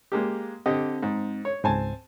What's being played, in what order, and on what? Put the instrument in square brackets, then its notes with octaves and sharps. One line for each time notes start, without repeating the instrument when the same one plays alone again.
[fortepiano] G#3 A#3 G4
[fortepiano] D3 G4 D#5 [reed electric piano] C4
[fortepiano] G#2
C#5
[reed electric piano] C#2 G#2 [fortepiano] C4 G#5 A5